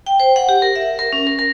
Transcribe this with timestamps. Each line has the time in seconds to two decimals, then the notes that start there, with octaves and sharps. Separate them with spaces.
0.06 G5
0.20 C5
0.36 F#5
0.49 G4
0.62 A#4
0.76 E5
0.99 A#4
1.13 C#4
1.27 A#4
1.39 A#4